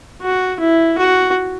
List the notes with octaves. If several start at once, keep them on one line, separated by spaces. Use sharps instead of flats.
F#4
E4
F#4